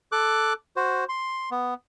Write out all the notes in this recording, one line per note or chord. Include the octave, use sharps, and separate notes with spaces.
A4 D6 F#6
F#4 C5
C6
B3